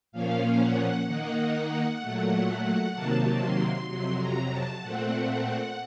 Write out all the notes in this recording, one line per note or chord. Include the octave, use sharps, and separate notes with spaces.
A#2 F3 A#3 C#4 F5
F#5
D#3 A#3 D#4 F#5
A#2 F#3 A3
C3 D#3 F#3 A#3 A5
C6
F2 C3 F#3 C6
A#5
A5
A#2 A3 C4 F#5